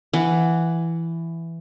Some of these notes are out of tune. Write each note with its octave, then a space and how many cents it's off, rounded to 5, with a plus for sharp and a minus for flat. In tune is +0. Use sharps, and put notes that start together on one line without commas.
E3 +10 F#5 +0